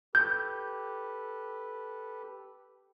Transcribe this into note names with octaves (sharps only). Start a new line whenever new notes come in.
G4 A4 B4 G6